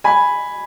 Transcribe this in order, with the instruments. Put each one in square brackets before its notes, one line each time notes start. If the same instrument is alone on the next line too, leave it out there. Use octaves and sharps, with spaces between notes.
[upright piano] G#5 B5